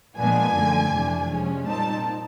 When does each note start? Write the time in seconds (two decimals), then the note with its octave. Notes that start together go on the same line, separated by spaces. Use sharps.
0.17 A#2 F3 G#3 B3 D4 G#5
0.55 F#2 D3 F3 A3
0.92 F2 C3 E3 A3 D4
1.29 C3 F3 G#3 C#4
1.66 A#2 G3 C4 D#4 A5